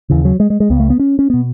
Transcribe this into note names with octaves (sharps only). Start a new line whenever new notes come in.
D#2 C#3 E3
F#3
G#3
G#3
G#3
C#2 C#3 B3
A3
B3
C#4
C#4
B2 B3